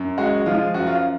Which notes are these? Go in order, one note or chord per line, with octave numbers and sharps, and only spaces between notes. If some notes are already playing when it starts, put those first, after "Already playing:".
Already playing: F#2
G#3 F#4
F3 F4
F#2 F#4
F4